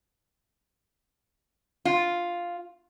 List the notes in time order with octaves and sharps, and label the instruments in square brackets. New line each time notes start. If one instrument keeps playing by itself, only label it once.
[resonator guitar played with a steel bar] F4